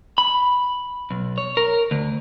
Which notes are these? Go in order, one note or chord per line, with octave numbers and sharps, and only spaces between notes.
B5
B1
C#5
A#4
D2